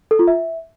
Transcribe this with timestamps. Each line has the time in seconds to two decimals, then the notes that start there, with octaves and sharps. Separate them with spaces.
0.11 A4
0.19 F4
0.28 E5